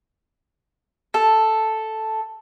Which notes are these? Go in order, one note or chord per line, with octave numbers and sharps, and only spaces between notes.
A4